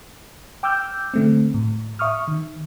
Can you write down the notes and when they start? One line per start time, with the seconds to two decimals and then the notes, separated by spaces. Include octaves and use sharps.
0.63 G5 D6 E6 F6 G6
1.14 D3 A3 C4
1.54 A2
1.99 E5 C#6 D#6 F6
2.28 D#3